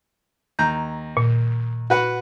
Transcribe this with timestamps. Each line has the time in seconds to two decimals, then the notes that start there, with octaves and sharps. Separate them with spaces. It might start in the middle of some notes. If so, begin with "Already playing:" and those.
0.59 D#2 A#5 G6
1.17 A#2
1.90 F#4 B4 F#5